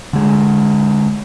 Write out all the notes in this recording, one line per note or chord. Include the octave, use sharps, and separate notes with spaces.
D3 G#3